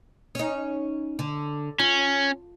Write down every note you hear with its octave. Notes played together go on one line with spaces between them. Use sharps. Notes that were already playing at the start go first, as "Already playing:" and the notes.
C#4 D#4
D3
C#4 F4